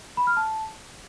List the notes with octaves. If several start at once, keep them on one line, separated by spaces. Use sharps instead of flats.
B5
F6
A5